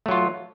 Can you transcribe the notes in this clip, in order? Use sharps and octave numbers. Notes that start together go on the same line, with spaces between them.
F#3 A3 F4